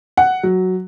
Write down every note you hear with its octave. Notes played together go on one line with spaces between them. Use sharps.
F#5
F#3